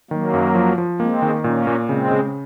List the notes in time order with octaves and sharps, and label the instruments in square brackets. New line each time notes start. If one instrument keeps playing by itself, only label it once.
[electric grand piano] D#3 [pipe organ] F#3 A#3
[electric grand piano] F#2
F3
F3
[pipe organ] G#3 C4 [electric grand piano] A#3
[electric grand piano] D#3
[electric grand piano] A#2 [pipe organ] A#3 C#4
[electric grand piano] A#2
[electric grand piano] C#3 [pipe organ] G#3 C4
[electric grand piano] C#3